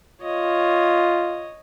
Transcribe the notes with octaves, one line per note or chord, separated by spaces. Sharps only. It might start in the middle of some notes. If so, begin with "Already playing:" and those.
F4 C#5 D#5